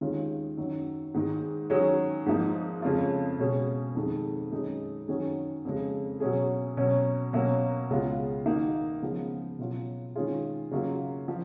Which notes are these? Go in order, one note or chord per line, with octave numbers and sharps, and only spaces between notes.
D#2 D#3 G#3 C#4 F4
F#2 D#3 F#3
G#2 D#3 G#3
D#3 F#3 C#4 G#4
G#2 F3 A#3 D#4
F2 C#3 G#3 C#4 F4
B2 G#3 C#4 G#4
F2 D#3 G#3
F#2 D#3 G#3 D#4
F#2 D#3 F#3 C#4 G#4
F2 C#3 G#3
B2 F#3 C#4 G#4
B2 F#3 C#4
B2 F#3 A#3 C#4
C#2 C#3 G#3 B3 F4
D#3 A#3 D#4 F#4
C#3 F3 G#3 B3
B2 F#3 C#4 F4
D#3 G#3 C#4 F4 G#4
C#3 F#3 A#3 F4
F3